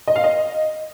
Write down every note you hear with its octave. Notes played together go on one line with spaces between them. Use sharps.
D#5
F5
D#5